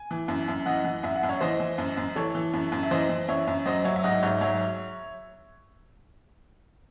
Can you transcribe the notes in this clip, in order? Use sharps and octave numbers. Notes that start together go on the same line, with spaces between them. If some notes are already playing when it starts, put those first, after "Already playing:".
Already playing: G#5
E3
F#2
F#2
E3 D#5 F#5
E3
F#2 E5
F#5
F#2
C#5 E5
E3 C5 D#5
E3
F#2
F#2
E3 A4 C#5
E3
F#2
F#2
E5
E3 C5 D#5
E3
F#2 C#5 E5
F#2
F#3 C5 D#5
F#3 C#5 E5
E5
G#2 D#5 F#5
G#2 C#5 E5
F#3 C#5 E5